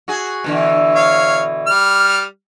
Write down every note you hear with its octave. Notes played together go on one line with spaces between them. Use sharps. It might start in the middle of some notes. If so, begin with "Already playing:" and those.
F#4 G#4
B2 D3 E3
C#5 F5
G3 F6